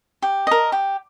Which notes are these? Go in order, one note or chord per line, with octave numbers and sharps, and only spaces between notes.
G4
A#4 D#5
G4